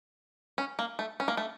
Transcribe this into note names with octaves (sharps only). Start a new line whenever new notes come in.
C#4
A#3
A3
C#4
A#3
A3